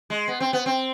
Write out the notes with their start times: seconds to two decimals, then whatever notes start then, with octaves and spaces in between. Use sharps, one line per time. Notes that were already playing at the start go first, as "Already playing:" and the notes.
0.10 G#3
0.28 B3
0.40 C4
0.53 B3
0.66 C4